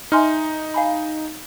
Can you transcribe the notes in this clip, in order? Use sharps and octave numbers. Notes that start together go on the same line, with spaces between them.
D#4 E5 G#5 C6 F6
F5 G#5 B5